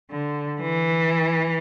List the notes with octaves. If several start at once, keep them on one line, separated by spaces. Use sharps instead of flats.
D3
E3